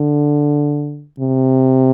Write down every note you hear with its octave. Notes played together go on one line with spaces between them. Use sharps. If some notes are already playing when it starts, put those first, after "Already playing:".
Already playing: D3
C3